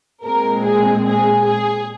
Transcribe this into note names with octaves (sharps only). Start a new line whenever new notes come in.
A#2 G#3 C4 A#4
G#4
G#4
G#4